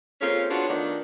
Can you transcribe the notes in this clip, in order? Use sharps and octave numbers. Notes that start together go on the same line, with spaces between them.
A#3 C4 C#4 F4 G#4 A4
B3 D4 F4 F#4 G#4 C#5
D#3 A3 B3 D4 D#4 F4